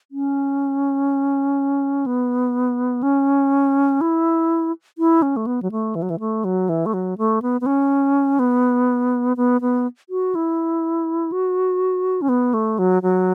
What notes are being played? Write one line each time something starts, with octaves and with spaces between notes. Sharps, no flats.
C#4
B3
C#4
E4
E4
C#4
A3
B3
F#3
A3
E3
F#3
E3
A3
F#3
E3
A3
F#3
A3
B3
B3
C#4
B3
B3
B3
F#4
E4
F#4
C#4
B3
A3
F#3
F#3